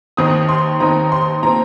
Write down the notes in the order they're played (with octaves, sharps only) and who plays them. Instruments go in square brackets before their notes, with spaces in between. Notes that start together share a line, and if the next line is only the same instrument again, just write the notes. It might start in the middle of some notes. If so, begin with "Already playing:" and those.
[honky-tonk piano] D#2 D#3 C4 D#4 D#6
C6
D#2 D#3 C4 D#4 A#5
C6
A#2 F3 C4 A#5